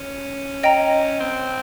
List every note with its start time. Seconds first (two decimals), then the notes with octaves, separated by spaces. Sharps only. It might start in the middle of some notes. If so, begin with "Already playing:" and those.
Already playing: C#4
0.63 D#5 G5 A#5
1.20 C4